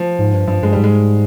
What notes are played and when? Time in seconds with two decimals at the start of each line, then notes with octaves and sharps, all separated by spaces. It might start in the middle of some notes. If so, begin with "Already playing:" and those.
Already playing: F3
0.19 G#2
0.33 G2
0.48 G2 F3
0.62 G2 G#3
0.73 G#2 G3
0.83 G#3